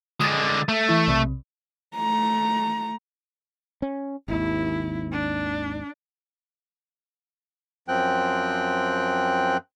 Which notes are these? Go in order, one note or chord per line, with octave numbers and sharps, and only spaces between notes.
D3 G#3 D#6 A6
A3
E3 E4
B1 C3
A3 A#5
C#4
G#1 D#2 E4
D4
F#2 F3 C4 G5 F#6